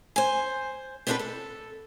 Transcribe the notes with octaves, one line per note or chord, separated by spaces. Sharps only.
C5 G#5
B3 C4 D4 E4 A4 B4
A4